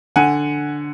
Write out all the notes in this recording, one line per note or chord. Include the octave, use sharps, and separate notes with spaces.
D3 F#5 G#5